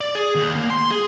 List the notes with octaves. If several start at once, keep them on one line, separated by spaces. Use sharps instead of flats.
D5
G#4
D#2
A#3
C6
G#4